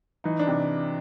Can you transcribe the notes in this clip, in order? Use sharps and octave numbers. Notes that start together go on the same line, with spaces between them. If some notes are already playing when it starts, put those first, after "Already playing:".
E3 D#4
D4
C3